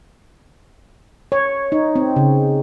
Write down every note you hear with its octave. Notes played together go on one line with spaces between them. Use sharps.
C#5
D#4
C4
C#3